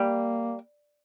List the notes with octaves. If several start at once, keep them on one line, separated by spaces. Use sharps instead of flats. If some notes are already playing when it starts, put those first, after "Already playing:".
Already playing: G3 A#3